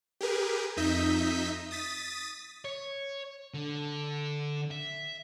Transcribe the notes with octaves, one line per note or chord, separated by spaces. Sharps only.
G4 G#4 A#4 B4
F2 D#4 D#5 E5 G6 B6
D#6 A6 B6
C#5
D3
E5